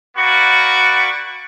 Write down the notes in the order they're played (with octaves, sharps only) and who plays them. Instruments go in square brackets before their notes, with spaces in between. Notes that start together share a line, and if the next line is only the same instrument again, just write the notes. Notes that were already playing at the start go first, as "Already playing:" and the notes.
[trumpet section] A#3 F#4 D5 B5 C#6